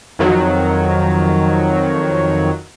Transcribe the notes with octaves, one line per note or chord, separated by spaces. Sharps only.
F2 D#3 F#3